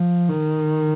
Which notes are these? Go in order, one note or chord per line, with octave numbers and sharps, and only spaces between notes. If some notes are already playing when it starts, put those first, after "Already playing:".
Already playing: F3
D#3